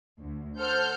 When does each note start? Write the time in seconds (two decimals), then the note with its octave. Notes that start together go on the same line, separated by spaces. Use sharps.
0.20 D2
0.57 A4 C5 F#5 F6 G6